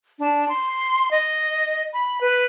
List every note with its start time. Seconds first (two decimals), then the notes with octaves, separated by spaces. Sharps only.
0.19 D4
0.49 C6
1.11 D#5
1.93 B5
2.21 B4